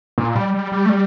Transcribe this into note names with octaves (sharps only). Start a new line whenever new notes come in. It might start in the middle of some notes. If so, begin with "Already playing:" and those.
A#2
G3
G3
G3
A3
G3